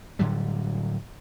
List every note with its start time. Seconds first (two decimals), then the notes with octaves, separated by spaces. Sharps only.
0.19 A2 D3 F#3 G3